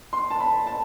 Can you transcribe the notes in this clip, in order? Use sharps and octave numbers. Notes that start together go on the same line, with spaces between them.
C6
A5
B5
A5